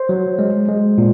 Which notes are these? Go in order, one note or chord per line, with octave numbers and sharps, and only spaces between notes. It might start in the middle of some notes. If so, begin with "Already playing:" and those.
Already playing: C5
F#3
G#3
G#3
A#2